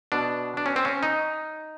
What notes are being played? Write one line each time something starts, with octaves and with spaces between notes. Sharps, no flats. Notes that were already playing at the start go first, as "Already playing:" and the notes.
B2 D4
D4
C#4
C4
C#4
D#4